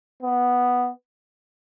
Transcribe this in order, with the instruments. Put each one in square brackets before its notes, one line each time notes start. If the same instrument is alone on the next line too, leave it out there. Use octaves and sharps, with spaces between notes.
[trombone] B3